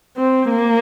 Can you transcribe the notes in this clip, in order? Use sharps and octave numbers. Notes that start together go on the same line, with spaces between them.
C4
A#3